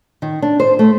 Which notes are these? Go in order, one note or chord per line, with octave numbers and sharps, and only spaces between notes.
D#3
D4
C5
A3